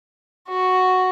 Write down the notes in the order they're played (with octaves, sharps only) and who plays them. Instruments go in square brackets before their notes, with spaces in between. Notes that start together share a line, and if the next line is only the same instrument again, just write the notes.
[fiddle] F#4